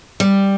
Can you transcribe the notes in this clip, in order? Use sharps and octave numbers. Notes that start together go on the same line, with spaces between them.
G3